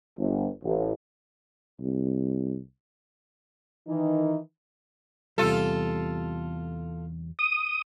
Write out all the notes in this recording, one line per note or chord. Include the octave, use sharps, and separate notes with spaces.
G1
A1
C2
D#3 E3 D#4
E2 C3 G3 F4 A4
D#6